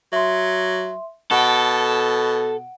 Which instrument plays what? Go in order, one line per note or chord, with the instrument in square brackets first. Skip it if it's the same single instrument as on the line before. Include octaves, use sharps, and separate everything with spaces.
[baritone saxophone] F#3 [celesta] E5 C6
[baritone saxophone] B2 [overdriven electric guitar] A4 [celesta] F#5 D7